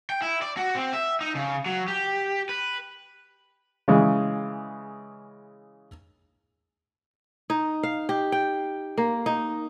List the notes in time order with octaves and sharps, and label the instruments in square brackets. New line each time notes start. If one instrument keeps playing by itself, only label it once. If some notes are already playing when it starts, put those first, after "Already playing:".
[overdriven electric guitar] G5
E4
D5
F#4
C4
E5
D#4
C#3
F#3
G4
B4
[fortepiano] C#3 E3 G#3
[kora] D#4
F5
G4
G5
A#3
D#4